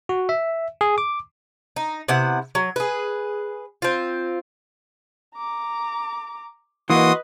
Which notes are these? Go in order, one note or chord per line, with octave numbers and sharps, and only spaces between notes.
F#4
E5
G#4
D6
D#4
C3 B3 E4 F#5
F#3
G#4 B4
C4 F4
A#5 D6
E3 A#3 F#4 B4 D#5 C6 D#6